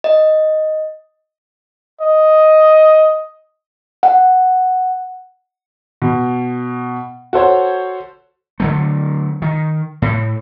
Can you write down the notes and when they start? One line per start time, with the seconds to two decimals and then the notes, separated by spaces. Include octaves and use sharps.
0.04 D#5
2.02 D#5
4.03 F#5
6.02 B2
7.33 F#4 A4 C5 C#5
8.60 D3 F#3 A3
9.42 D#3
10.02 A2